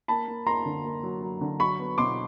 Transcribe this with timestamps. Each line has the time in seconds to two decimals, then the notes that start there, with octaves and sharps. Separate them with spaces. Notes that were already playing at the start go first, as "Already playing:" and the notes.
0.08 A#3 A5 B5
0.28 A#3
0.46 A#3 A#5 C6
0.66 D3
0.84 A#3
1.03 F#3
1.22 F#3
1.41 D3
1.60 F#3 B5 C#6
1.79 B3
1.98 B2 C6 D6